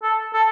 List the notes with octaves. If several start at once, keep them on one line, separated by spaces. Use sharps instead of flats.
A4
A4